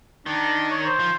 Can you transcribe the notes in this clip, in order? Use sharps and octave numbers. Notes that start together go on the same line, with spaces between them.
D#3 D4
C#5
C5
F3